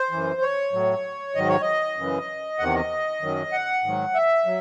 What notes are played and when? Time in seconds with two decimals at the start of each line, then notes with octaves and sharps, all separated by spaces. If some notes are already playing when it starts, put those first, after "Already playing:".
Already playing: C5
0.11 F#2 E3
0.42 C#5
0.73 A2 F#3
1.35 G#2 D#3 F#3 D#5
1.49 C#5
1.62 D#5
1.97 F#2 C#3 E3
2.59 E2 C3 D#3 F#5
2.75 D#5
3.21 F#2 D#3 F#3
3.52 F#5
3.84 G#2 D#3 F#3
4.15 E5
4.46 F#3